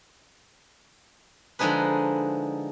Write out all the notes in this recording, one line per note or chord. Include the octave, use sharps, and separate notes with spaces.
D3 F3 G#3 D#4 G#4 B4